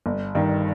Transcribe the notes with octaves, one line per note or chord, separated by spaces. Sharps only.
G1
G2 D#3